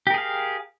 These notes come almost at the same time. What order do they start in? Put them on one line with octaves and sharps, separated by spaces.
G4 A#4 G#4 F5